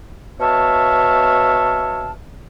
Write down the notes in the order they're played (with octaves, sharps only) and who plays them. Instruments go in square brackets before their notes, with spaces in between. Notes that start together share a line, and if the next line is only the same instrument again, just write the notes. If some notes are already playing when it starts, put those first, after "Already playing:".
[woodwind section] B2 C#5 E5 F5 A5